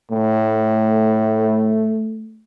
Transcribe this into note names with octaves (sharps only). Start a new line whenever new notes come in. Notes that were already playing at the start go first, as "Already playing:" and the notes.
A2 A3